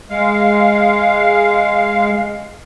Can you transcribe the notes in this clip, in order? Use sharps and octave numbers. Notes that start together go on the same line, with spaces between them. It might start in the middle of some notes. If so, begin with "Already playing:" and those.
G#3 F5